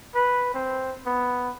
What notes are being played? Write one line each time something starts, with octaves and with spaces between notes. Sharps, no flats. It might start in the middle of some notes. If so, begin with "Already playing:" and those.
B4
C4
B3